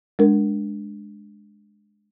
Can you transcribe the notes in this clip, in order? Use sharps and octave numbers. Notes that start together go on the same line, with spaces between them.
G#3 D4 A#4